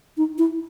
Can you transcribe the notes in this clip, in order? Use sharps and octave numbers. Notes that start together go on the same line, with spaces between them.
D#4
E4